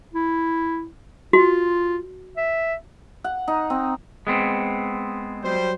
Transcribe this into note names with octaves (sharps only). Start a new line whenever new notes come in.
E4
F4 F#4
E5
F#5
D#4
C4
G#3 B3 C4
F#3 G3 C5